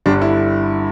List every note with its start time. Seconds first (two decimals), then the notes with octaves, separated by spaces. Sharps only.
0.06 G1 G2 D3 G3 D4
0.22 E4